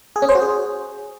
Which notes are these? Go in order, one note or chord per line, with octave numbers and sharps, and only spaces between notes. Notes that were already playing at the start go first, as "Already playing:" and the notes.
G#4
C#4
C5
F#4
G#4